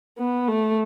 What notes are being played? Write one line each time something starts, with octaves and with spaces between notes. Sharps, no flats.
B3
A3